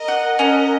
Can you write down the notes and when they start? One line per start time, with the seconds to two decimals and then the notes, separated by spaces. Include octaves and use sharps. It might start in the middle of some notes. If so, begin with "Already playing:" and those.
Already playing: A#4 D#5
0.08 F#5
0.38 C#4 A#4 D#5